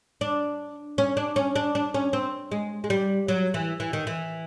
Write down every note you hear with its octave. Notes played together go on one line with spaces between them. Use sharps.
D4
C#4
D4
C#4
D4
D4
C#4
C4
G#3
G#3
G3
F#3
E3
E3
D#3
E3